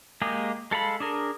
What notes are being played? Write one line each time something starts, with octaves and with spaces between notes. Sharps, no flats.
G#3 A#3 G4 G#4
G#3 A4 F5 B5
D4 G#4 A#4